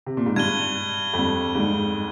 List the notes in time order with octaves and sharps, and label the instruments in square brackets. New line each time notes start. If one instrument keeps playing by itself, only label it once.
[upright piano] C3
A#2
G#2
[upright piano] G2 [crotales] G#6 D#7 G7
[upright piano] F2
G2
G#2
G2